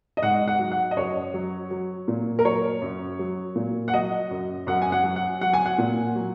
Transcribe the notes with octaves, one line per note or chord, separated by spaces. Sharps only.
D#5
G#2 F#5
F#5
F#3
F#5
D#5
F#2 C#5
F#3
F#3
A#2
A#4
F#3 C#5
F#2
F#3
A#2
F#5
F#3 D#5
F#2
F#2 F#5
G#5
F#5
F#3
F#5
F#3 F#5
G#5
F#5
A#2
F#3